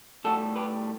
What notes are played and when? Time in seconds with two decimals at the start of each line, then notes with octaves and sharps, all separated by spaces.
0.25 A2 G3 F#4 A4
0.56 G4 B4